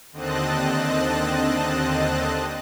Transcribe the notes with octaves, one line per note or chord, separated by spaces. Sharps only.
D#2 D3 C4 D#5 A5 F#6